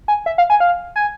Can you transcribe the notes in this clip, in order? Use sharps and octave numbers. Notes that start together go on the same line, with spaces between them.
G#5
E5
F5
G#5
F5
G#5